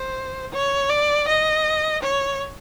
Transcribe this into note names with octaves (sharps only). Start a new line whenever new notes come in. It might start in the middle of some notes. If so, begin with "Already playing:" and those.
Already playing: C5
C#5
D5
D#5
C#5